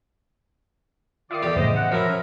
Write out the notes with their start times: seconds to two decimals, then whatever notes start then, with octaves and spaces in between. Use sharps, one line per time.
1.31 D#3 F4 D5 E5 D#6 C7
1.43 E2 G4 A4
1.56 F2 A2 C#3 C5 D#5
1.75 F#5
1.92 F3 F#3 E4 A#4
2.09 C#4